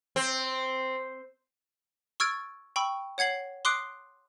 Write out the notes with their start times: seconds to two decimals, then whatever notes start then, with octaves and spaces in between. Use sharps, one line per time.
0.16 C4
2.20 C#6 E6 F6 G#6 A6 D7
2.76 G5 B5 C#6 E6
3.18 C#5 F#5 G#6 C7 F#7
3.65 C6 D6 D#6 F#6 C7 D7